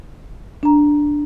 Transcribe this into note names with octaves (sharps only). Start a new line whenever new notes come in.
D4 A#5